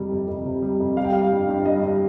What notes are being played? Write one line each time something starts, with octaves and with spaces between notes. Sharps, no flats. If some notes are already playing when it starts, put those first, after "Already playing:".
Already playing: F2 C3 G3
F2
F2
C3
G3
F2
G3 F5
G5
G3 F5
G2
G2
G3 D#5
G3